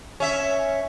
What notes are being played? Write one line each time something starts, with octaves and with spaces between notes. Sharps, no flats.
C#4 E5